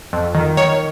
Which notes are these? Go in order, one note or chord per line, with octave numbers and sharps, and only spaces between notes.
F2
D#3
D#3 C#5